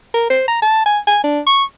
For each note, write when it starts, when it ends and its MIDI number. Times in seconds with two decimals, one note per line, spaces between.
0.14 0.30 70
0.30 0.47 72
0.48 0.62 82
0.62 0.85 81
0.86 0.99 80
1.07 1.22 80
1.24 1.40 62
1.47 1.64 85